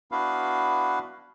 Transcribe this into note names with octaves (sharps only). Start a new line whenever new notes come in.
B3 D4 E4 F#4 B4 F5